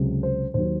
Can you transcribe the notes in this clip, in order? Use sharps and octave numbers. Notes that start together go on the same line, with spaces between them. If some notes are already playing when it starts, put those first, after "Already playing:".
Already playing: C#2 C3 F#3
C5
D#2 D#3 F#3 C5